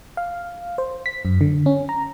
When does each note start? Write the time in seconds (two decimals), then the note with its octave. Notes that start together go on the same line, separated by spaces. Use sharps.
0.17 F5
0.78 C5
1.06 B6
1.25 F#2
1.41 D3
1.66 C#4
1.89 A#5